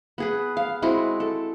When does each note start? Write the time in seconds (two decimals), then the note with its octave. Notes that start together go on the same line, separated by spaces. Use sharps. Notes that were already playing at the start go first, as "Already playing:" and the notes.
0.18 B3 G#4 B4
0.57 F5
0.82 G#3 C4 E4 F#4
1.20 A4